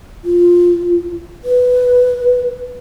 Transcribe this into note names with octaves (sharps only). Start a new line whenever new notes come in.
F4
B4